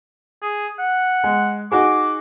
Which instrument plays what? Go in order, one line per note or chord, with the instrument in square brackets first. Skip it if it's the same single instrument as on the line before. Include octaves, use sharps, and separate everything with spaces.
[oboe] G#4
F#5
[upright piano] G#3
[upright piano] D#4 F#4 G#4 [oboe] D6